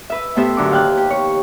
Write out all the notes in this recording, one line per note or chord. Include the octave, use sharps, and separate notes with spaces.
B4 E5
A2 B3 G4 C5 E5
F#2 D3 D6
D#2 F5 G5 F#6
G4
C#5